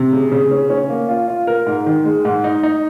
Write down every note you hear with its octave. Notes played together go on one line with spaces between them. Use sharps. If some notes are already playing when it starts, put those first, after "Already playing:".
Already playing: C3
C#3
C#3
C#4
C#4
A#3
F4
F4
A#4
G#2
D#3
G#3
G#2
D#4
D#4